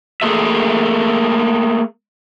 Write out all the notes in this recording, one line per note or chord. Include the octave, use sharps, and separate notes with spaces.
A3 A#3 G#4 A4 E5